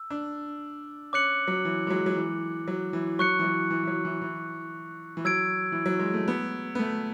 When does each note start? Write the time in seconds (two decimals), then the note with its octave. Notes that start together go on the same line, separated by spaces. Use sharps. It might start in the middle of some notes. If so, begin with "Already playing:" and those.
Already playing: E6
0.10 D4
1.13 C#4 D6 F#6 C#7 F#7
1.48 F#3
1.65 E3
1.87 G#3
1.90 F#3
2.06 F#3
2.17 E3
2.68 F#3
2.93 E3
3.19 F#3 C#6 F#6 C#7
3.39 E3
3.45 F#3
3.70 E3
3.83 E3
3.88 F#3
4.05 E3
4.22 E3
5.17 E3
5.25 F#3 E6 G#6 D7
5.72 E3
5.86 F#3
5.99 G#3
6.14 A3
6.28 B3
6.75 B3
6.79 A3